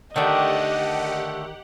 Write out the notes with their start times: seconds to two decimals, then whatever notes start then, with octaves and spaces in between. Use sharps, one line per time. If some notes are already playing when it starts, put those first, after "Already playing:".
0.16 D3 D#3 A3 D4 G4 D5 D#5 F#5